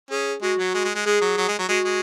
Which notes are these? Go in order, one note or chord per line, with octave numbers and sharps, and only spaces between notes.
C#4 G#4
G#3 F#4
F#3
G#3
G#3
G#3
G#3 G#4
F#3
F#3
G#3
F#3
G#3 F#4
G#3